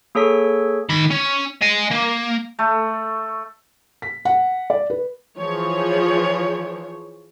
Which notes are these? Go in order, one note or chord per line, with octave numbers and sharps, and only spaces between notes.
A#3 G#4 A4 C#5 B6
D#3 B5
C#4
D#5 G#5
A#3
A3
B6
F#5
D5
B4
E3 F3 G#4 C#5